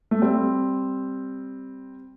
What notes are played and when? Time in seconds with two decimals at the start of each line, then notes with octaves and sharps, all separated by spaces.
0.11 A3
0.22 G3 C4